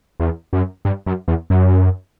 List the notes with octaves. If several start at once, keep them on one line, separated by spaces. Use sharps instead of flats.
E2
F#2
G2
F#2
E2
F#2